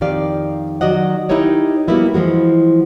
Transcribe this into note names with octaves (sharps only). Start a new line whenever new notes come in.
F2 D#3 G4 D5 F5
D#3 F#3 F#4 D5 D#5 F#5
D#4 E4 G4 A#4 C#5 D#5
G3 A#3 B3 E4 F#4
E3 F3 G#3 F#4